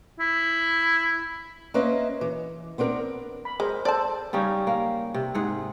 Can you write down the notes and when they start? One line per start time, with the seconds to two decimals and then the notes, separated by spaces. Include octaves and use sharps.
0.20 E4
1.74 A#3 C#4 B4 C5 D#5 E5
2.21 E3
2.78 B3 C4 D4 A#4
3.45 B5
3.60 G#3 A#4 C5
3.85 A4 C5 D5 A5
4.33 C#3 G3 C#4 D#4
4.67 A#3
5.14 C3
5.34 G#2 G#4 F#5